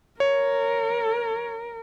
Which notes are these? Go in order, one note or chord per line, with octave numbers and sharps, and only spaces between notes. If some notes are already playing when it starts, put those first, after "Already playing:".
A#4 C#5